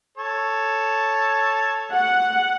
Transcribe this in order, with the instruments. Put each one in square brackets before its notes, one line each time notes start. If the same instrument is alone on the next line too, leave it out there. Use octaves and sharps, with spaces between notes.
[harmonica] A4 C#5
[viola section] F#5